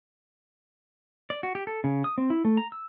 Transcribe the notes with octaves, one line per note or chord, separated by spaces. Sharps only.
D5
F#4
G4
A4
C#3
D#6
C4
E4
A3
A#5
E6